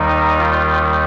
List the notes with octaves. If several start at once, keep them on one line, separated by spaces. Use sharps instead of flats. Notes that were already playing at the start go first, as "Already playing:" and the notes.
Already playing: D#2 D#3 G3 D#4
F4